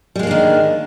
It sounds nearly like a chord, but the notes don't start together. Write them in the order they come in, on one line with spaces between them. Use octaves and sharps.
G3 G#3 A#3 D4 D#3